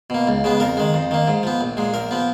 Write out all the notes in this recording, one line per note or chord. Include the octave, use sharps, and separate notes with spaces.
B2 A#3
C#2
C#3 G#3 B3
F2 A#4
D#3 G#3
F2
D#3 A#3
G#2
F3 B3
A#1
A#2 G#3
A#1 A#4
F3 B3